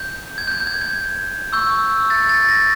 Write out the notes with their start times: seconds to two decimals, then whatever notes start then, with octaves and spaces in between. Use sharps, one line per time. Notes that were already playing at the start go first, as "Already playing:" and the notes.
Already playing: G6
0.38 G#6
0.47 G6
0.52 G#6
0.60 G6
0.67 G#6
0.81 G#6
1.53 C#6 E6 G6
2.10 A6
2.29 A6
2.49 A#6